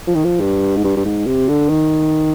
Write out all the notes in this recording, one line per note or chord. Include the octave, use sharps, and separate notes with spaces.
F3
D#3
F3
G2
G#2
G2
G2
G#2
C3
D3
D#3